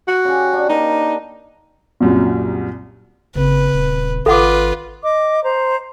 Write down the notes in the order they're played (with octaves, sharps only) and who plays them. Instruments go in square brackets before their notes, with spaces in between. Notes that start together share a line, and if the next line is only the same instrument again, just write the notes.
[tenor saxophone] F#4
[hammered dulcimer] C#3 G4
D4
[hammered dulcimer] A#3 [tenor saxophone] D#4
[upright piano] C2 F#2 A#2
[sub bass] F#1 [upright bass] C#3 C4 [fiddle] B4
[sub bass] D#1
[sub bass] G#1 [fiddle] F4 B4 [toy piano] A4 F#5 D6
[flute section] D#5 D6
C5 A#5